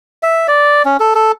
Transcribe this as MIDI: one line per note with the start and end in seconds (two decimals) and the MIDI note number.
0.23 0.47 76
0.48 0.83 74
0.85 0.97 61
1.00 1.14 69
1.15 1.32 69